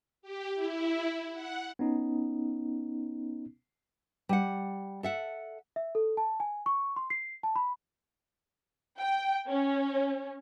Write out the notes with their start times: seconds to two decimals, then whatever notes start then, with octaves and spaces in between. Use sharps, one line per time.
0.22 G4
0.54 E4
1.33 F#5
1.79 B3 C#4 D#4
4.29 G3 F#5
5.03 A4 E5 F#5
5.76 E5
5.95 A4
6.17 A5
6.40 G#5
6.66 C#6
6.96 C6
7.10 C7
7.43 A5
7.56 B5
9.00 G5
9.49 C#4